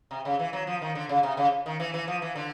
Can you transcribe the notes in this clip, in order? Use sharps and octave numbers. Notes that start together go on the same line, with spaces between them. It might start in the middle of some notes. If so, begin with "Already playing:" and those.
C3
C#3
E3
F#3
F3
D#3
D3
C#3
C3
C#3
D#3
E3
E3
F3
E3
D3